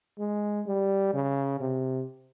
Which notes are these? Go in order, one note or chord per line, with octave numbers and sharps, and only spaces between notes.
G#3
G3
C#3
C3